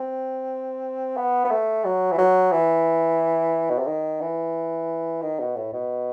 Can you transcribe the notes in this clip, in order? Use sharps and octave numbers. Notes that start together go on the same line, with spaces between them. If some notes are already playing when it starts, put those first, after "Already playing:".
Already playing: C4
B3
B3
A3
F#3
E3
F#3
E3
B2
C3
D#3
E3
D#3
B2
A2
B2